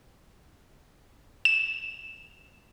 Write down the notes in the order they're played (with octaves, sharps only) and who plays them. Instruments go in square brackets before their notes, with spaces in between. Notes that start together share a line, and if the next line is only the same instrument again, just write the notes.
[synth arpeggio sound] E7